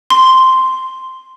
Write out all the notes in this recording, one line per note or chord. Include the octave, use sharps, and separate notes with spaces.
C6